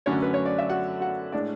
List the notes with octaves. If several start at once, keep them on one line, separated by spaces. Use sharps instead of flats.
F#2 D3 F#3 A3 C#4 C#5
B4
C#5
D5
E5
F#4 F#5
F#4 F#5
A2 G#3 D4 D5